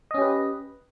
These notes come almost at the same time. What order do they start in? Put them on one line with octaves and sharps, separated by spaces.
D#5 C#4 G4 B4